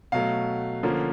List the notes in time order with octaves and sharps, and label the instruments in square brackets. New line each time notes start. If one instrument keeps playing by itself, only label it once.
[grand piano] B2 F#3 A3 F5
D3 F3 A#3 C#4